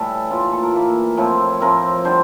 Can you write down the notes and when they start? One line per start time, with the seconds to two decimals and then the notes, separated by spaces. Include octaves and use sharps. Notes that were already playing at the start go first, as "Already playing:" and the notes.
Already playing: A2 E3 G3 A4
0.30 A2 E3 A#3 F4
0.42 F4
0.52 A4
0.63 A#4
0.74 A2 E3 A#3
1.17 A2 F3 C4 E4
1.60 A2 F3 C4 E4 A#4
2.04 D3 G3 D4 C5